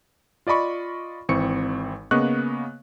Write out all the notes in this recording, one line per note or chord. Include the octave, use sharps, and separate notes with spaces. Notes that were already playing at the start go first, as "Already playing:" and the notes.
F4 D5 D#5 B5 C#6
G#1 E3 C4 C#6 C#7
C#3 A#3 B3 D#5 C#6 F#6